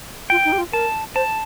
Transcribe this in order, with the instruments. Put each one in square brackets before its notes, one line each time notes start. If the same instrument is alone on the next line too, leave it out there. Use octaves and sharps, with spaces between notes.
[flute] F4 [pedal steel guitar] G5
[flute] D#4
G4
F4
[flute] A#4 [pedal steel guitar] A5
[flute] C5 [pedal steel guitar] A5